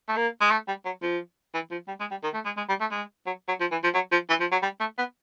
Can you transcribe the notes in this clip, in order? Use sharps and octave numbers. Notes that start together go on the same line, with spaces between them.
A3
A#3
G#3
A3
G3
F#3
F3
E3
F3
G3
G#3
G3
D#3
A3
G#3
G#3
G3
A3
G#3
F#3
F#3
F3
E3
F3
F#3
F3
E3
F3
F#3
G3
A3
B3